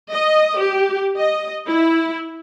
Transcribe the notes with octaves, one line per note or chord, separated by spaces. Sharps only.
D#5
G4
D#5
E4